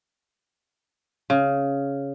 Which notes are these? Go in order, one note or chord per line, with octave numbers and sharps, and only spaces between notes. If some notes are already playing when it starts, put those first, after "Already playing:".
C#3